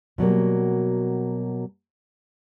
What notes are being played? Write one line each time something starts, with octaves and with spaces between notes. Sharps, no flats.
B2 F#3 G3 A#3